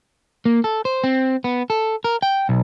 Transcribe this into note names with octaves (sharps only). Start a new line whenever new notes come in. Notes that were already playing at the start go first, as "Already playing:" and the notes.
A#3
A4
C5
C4
B3
A4
A#4
G5
B1